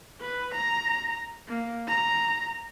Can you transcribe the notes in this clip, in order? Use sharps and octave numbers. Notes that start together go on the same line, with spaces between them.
B4
A#5
A#3
A#5